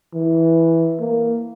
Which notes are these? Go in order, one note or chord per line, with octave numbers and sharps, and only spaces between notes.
E3
A#3